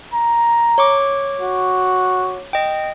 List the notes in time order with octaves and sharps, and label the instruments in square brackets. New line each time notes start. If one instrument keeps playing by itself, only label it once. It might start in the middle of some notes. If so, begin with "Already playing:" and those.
[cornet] A#5
[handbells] C#5 C#6 D6
[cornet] F#4
[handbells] D#5 G5